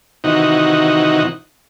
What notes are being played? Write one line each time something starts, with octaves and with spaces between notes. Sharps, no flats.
C3 D#3 E3 D#4 F#4